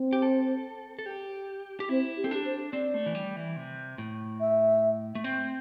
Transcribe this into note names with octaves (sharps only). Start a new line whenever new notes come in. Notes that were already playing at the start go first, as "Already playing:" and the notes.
Already playing: C4
G4
A4
A4
G4
G4
C4 E4
G4
C4 A4
D4 G4
C5
C4 D5
A3
E3
G3
E3
C3
A2
E5
A3
C4